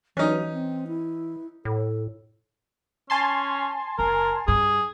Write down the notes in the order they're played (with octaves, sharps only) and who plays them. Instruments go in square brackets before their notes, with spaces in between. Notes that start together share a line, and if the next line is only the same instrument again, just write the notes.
[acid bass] E3 [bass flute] F#3 [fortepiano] C#4 D#4
[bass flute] C4
E4
[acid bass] A2 [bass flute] A4
[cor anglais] C#4 [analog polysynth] G#5 A5 C6
[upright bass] F#1 [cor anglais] A#4
[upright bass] G2 [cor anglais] G#4